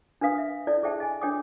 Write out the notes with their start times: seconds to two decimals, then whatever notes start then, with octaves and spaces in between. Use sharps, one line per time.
0.21 D4 A#4 B4 F5 D#6
0.38 E5
0.67 E4 A4 C#5 D5
0.83 G#4 A4 C5 E5 G5 A5
1.00 D#5 G#5
1.21 D4 A#4 C#5 G5 D6 D#6